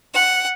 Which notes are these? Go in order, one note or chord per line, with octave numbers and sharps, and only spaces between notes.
F#5